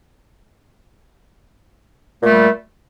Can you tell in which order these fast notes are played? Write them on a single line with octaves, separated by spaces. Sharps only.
A#2 A3 G3